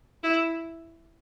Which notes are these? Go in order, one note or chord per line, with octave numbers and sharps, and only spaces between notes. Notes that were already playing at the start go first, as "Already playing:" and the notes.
E4